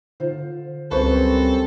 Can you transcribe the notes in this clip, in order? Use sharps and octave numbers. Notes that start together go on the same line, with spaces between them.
D3 F4 C5
C#2 F#2 G3 C4 A4 B4 C5 C#6